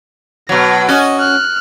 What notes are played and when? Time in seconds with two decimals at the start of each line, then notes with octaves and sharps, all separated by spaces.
0.49 B2 F#3 A#6
0.88 C#4 F#4 D#5
1.20 F6 F#6